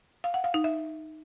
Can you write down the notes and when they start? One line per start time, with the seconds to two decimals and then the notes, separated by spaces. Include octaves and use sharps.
0.24 F5
0.34 F#5
0.44 F5
0.54 D#4
0.64 E5